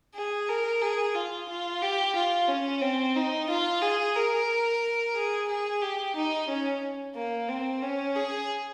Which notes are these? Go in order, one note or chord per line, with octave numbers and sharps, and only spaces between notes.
G#4
A#4
G#4
F4
F4
G4
F4
C#4
C4
D#4
F4
G#4
A#4
G#4
G#4
G4
D#4
C#4
A#3
C4
C#4
G#4